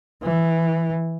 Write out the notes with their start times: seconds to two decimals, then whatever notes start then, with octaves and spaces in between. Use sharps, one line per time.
0.23 E3